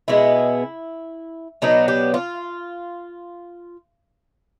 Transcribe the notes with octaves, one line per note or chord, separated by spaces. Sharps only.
B2 G#3 B3 E4
B2 F#3 B3 D4 D#4
G4
F4